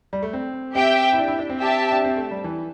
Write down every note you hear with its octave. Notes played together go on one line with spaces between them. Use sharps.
G3
A3
C4
C4 G4 E5 G5
E4
D4
E4
D4
C4
G4 E5 A5
D4
C4
A3
G3
E3